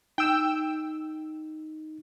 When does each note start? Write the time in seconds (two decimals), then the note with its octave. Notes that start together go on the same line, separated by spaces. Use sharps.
0.18 D#4 G5 E6